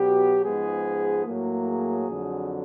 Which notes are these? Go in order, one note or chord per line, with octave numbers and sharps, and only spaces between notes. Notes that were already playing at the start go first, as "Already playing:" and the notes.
Already playing: B2 F#3 B3 G4
G#2 F3 G#3 B3 G#4
A2 F#3 A#3
G#4
F2 D3 F#3